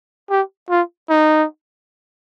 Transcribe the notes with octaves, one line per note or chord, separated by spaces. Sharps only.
G4
F4
D#4